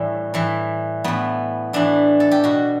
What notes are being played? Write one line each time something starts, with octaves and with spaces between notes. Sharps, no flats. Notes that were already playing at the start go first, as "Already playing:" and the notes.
Already playing: A2 E3 G3
A2 E3
A2 E3 B3
A2 E3 D4
A4
G4
B2 F#4